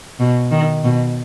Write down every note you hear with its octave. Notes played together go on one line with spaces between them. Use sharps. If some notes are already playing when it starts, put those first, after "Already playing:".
B2
D#3
B2